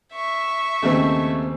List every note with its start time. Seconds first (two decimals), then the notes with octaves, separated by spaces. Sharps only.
0.13 E5 C#6
0.82 D#2 C#3 A3 C4